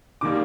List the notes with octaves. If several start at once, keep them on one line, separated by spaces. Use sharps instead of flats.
D#3 G3 A#3 D6